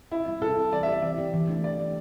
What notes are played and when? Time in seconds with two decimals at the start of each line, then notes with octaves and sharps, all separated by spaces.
0.11 C3 E4
0.26 G3 C4
0.42 C3 A4
0.57 G3 C4
0.72 E3 D5
0.83 E5
0.87 C4 G4 D5
1.02 E3 D5
1.18 C4 G4
1.34 E3
1.48 A3 D4 G4
1.64 E3 D5
1.79 A3 D4 G4